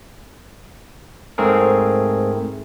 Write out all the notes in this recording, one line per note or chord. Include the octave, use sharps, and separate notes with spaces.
G#2 A3 C4 G#4 A#4